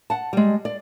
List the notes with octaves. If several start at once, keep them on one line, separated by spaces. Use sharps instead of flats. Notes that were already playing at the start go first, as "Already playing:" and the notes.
F#5 A5
G3 G#3
D5